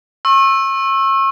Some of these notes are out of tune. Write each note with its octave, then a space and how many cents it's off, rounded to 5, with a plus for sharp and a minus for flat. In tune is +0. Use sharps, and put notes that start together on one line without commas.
C#6 -35 E6 +0